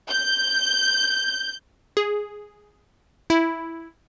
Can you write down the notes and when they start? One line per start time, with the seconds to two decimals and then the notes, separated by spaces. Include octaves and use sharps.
0.10 G6
1.97 G#4
3.30 E4